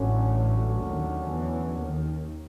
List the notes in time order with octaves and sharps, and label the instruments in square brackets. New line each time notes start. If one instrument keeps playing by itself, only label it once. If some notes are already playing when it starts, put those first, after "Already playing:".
Already playing: [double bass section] A1 A2 [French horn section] D3 F#3 A3 C#4
[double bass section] D#2 D#3
E2 E3
D#2 D#3